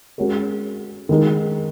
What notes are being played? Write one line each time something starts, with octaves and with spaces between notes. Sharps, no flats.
G#3 C#4 F#4 A#4
D#3 G#3 D#4 A#4